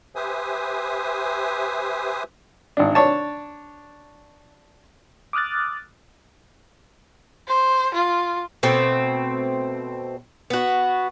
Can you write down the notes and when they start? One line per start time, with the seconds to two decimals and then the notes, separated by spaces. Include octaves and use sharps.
0.16 G4 B4 C5 E5 G#5 D#6
2.77 G#1 D4
2.95 D4 C#5 A5
5.33 D6 D#6 F6 F#6 A6
7.48 C5
7.94 F4
8.63 B2 A3 C4
10.50 B3 F#4